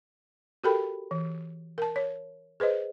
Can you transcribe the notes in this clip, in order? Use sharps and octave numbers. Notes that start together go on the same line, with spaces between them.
F#4 G4 A4 A#4 G5 B5
E3
A#4 A5
C#5
G#4 B4 C5 D#5